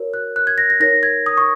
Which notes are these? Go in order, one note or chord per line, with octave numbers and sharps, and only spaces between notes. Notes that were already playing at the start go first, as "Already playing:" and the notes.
Already playing: F#4 A#4 C#5
F#6
F#6
G#6
A#6
A#6
D#4 A#4 C#5 A#6
G#6
D#6
C#6